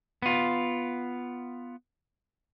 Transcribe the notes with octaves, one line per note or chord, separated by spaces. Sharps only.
B3 F4